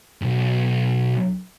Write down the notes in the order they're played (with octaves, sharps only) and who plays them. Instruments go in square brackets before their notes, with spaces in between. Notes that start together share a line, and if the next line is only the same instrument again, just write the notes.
[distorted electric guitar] B1 G2